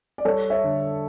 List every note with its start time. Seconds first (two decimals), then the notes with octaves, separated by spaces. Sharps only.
0.18 D5
0.25 G3 A4 C#5
0.50 C#5 E5
0.64 D3